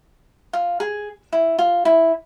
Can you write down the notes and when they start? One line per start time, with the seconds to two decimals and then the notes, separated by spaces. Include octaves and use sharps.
0.53 F4
0.80 G#4
1.33 E4
1.59 F4
1.85 E4